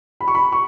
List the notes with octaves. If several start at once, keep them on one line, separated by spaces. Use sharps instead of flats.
B5
C#6
B5
C#6